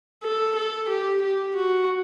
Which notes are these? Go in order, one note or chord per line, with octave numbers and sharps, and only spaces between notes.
A4
A4
G4
G4
F#4